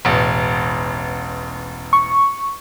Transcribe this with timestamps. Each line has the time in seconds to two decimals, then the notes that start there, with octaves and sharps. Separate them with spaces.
0.05 E1 A1
1.93 C#6